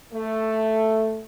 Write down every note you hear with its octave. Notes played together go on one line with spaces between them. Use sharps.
A3